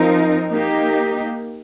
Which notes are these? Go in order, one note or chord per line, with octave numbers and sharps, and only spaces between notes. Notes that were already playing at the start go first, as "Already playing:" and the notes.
Already playing: F3 C4 D#4 A#4
A#3 D#4 G4